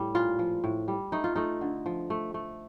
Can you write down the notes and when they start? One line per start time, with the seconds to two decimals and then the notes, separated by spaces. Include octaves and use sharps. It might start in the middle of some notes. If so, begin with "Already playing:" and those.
Already playing: A2 G3
0.15 A#2 F4
0.39 F3
0.64 A2
0.88 G3
1.12 A3 D#4
1.24 F4
1.36 A3 D#4
1.61 D3
1.86 F3
2.10 A3
2.34 A3